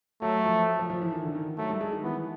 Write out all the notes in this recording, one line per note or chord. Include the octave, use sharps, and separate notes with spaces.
F#3 A3
F3
F3
F3
E3
D#3
D3
D#3
F#3 A3
G3
G#3
D#3
E3 B3